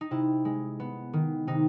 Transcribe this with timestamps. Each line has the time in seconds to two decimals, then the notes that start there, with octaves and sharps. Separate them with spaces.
0.01 D#4
0.11 C3 E4
0.45 G#3
0.80 B3
1.13 D#3
1.47 C3 D#4